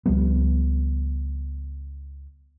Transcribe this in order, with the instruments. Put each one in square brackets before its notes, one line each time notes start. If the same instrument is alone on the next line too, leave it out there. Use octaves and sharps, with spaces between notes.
[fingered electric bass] C#2 F3 G3 B3